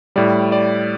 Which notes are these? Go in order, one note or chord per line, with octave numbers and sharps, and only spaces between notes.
A2 G3 D5
D5